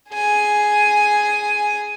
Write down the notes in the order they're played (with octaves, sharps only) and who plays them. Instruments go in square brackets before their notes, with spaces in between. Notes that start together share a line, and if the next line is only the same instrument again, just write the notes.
[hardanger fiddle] G#4 G#5